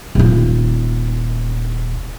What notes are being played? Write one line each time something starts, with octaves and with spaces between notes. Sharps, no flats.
D#1 F4